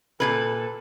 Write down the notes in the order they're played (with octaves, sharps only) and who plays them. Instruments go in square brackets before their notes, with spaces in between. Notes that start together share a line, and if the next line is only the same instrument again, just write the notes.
[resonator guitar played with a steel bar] A#2 E3 B4 [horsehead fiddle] A4